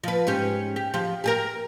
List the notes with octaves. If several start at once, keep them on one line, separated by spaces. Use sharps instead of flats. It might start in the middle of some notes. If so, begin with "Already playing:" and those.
F3 B4
G#2 C#4 G4
G4
F3 G4
G4 G#4 A#4